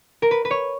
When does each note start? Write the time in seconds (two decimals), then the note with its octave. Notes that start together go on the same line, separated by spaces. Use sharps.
0.22 A#4
0.31 B4
0.45 B4
0.51 C#5